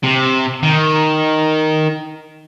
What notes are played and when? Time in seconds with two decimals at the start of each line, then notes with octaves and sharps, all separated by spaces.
0.03 C3
0.63 D#3